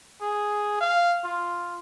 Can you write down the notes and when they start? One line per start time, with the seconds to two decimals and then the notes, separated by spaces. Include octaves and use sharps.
0.21 G#4
0.81 F5
1.24 F4